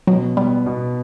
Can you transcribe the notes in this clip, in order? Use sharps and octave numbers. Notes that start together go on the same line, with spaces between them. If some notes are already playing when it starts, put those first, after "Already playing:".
B2 F#3
G3 B3
B2